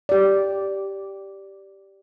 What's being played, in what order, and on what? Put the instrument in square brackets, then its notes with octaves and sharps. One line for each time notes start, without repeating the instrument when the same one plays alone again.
[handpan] G4 D5